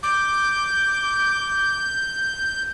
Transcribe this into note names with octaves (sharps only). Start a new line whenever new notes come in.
D6 G6